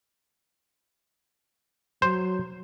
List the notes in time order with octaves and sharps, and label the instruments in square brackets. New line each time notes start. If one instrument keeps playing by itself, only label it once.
[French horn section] F#3 [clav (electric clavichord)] C5